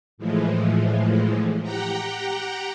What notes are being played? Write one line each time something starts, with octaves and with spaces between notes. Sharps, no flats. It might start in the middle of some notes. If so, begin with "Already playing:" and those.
A2 E3 F3 G#3
G4 F#5 G5 A#5